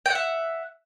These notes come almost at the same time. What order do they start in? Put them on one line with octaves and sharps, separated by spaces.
G5 F#5 E5